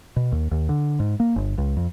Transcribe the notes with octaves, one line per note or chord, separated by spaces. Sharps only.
B2
D#2
D#2
D3
G#2
A#3
G1
C#2
F2